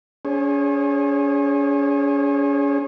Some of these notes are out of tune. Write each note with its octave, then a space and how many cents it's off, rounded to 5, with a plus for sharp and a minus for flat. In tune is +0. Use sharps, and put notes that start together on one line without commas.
C#4 +40 G#4 +0 C#5 -40